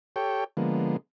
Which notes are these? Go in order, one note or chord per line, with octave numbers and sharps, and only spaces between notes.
G4 A4 C#5 G5
D3 F3 G#3 A#3 B3